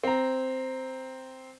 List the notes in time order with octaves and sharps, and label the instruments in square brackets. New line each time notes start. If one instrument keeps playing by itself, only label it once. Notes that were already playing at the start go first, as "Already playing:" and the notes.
[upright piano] C4 A#5